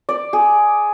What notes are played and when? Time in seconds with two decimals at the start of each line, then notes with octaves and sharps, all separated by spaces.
0.09 D5
0.33 G#4